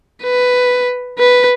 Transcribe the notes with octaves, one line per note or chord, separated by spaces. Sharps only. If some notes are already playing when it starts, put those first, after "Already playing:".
B4
B4